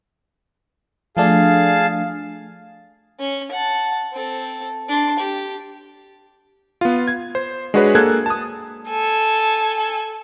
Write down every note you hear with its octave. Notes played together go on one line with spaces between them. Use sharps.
F3 A3 D4 G#4 F5 A5
C#4
F#5 A5
C4 A4
D4 C6
G4
B3 F4
G#6
C5
G#3 D4 F#4 G#4 B4 C#5
A#3 G#4 A4 F#6 G#6
A5 D#6
A4 G#5